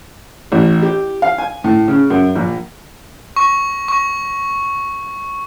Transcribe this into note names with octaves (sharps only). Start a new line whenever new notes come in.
A1
G4
F5
G#5
A2
C#3
F#2
A#1
C#6
C#6